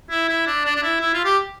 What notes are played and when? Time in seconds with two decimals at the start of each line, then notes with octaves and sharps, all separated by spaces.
0.10 E4
0.28 E4
0.47 D4
0.65 D4
0.76 D4
0.83 E4
1.00 E4
1.13 F4
1.25 G4